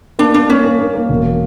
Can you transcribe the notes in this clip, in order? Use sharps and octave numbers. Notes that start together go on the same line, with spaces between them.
A#3 D4
A#3 D4
A#3 C#4
A#3
A#3
A#3
E1